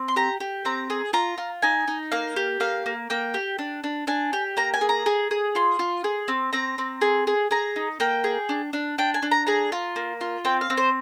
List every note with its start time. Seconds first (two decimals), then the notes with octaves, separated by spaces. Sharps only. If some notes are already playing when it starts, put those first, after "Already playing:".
Already playing: C4
0.08 C6
0.16 G4 A#5
0.40 G4
0.65 C4 A#5
0.90 G#4
1.13 F4 A#5
1.38 F4
1.62 D#4 G#5
1.88 D#4
2.12 A#3 F5
2.36 G4
2.60 A#3 F5
2.86 A#3
3.10 A#3 G5
3.34 G4
3.59 D4
3.84 D4
4.07 D4 G#5
4.33 G4
4.57 A#3 A#5
4.74 G#5
4.81 G#4
4.89 A#5
5.06 G#4
5.31 G#4
5.55 F4 C6
5.79 F4
6.04 G#4
6.28 C4
6.53 C4 A#5
6.78 C4
7.01 G#4
7.27 G#4
7.51 G#4 A#5
7.76 D#4
8.00 A#3 G5
8.24 G#4
8.49 D4
8.73 D4
8.98 D4 G5
9.14 G#5
9.23 D4
9.31 A#5
9.47 G#4 A#5
9.72 F4
9.96 A#3
10.21 F4
10.45 C4 G5
10.61 F5
10.70 C4
10.77 C5